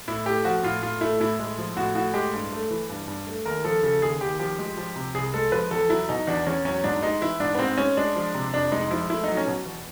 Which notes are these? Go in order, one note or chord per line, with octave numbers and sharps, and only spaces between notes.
A2 E4
A3 G4
F3 F#4
A2 F4
A2 F4
A3 E4
A2 E4
G#3
F3
A2 F#4
A2 F#4
G#3 G4
G2
A3
E3
G2
G2
A3
D#2 A#4
F3 A4
C#3 A4
D#2 G#4
D#2 G4
F3 G4
G#3
F3
C3
C2 G#4
G#3 A4
F3 B4
E2 A4
F#3 E4
B2 D#4
E2 D4
E2 C#4
F#3 C#4
G#2 D4
G#3 D#4
E3 E4
G#2 D4
B3
G#2 C4
G#3 C#4
G#3 D4
F3
C3
F2 D4
G#3 D#4
F3 E4
A3 E4
F#3 D#4
C#4
B2
E2